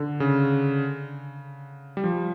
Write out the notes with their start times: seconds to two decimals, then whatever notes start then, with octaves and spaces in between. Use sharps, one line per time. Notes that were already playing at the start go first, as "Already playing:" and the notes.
Already playing: D3
0.20 C#3
1.97 G3
2.04 F3